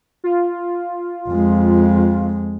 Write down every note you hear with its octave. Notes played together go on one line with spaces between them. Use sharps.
F4
F2 G#3